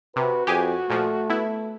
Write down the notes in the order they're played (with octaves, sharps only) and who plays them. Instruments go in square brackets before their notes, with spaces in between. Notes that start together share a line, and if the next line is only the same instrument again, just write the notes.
[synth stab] C3 [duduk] F#4 [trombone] B4
[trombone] F2 [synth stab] G4 G#4 G#5
[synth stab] A#2 F3 [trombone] A3
[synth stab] B3 E4